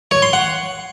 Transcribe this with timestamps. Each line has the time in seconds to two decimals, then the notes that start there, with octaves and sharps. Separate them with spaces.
0.11 C#5
0.22 C6
0.33 F#5